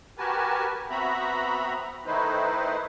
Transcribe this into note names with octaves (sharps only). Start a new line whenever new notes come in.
F#4 G4 A#4 B4 G#5 A5
B3 C4 F#4 E5 A#5 B5
D#3 A3 D#4 E4 B4 C5